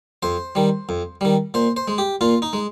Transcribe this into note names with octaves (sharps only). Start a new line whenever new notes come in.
F2 C5
D#3 G3
F2
D#3 G3
A#2 C5
C5
G#3
G4
A#2 F4
D#4
G#3